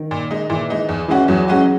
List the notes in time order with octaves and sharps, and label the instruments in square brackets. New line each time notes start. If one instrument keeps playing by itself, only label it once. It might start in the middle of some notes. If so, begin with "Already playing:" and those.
Already playing: [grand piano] D#3
[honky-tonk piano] A#2
G#3 D#4
[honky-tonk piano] A#2 [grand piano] E3
[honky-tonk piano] G#3 D#4
E2
[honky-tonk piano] C#3 G#3 C#4 F#4 [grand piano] E3
[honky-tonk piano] E2 [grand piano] F#3
[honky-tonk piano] C#3 G#3 C#4 F#4